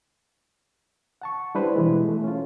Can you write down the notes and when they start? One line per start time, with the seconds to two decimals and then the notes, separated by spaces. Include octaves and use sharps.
1.22 F#5 A5 C#6
1.55 G3 D4 E4 B4 C5
1.76 B2 E3 G#3
2.04 A3 G#4
2.24 C#4 F4